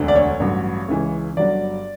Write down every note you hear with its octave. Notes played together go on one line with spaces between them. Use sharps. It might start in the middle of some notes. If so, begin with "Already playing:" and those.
Already playing: E1 D2 D3
D5
C#5
A1 G2 F#3
C#2 C#3 E3
G1 G2 F#3 D5